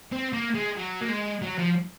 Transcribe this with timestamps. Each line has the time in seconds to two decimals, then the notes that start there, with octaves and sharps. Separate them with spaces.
0.12 C4
0.33 A#3
0.55 G#3
0.77 F#3
1.01 A#3
1.09 G#3
1.42 F#3
1.58 F3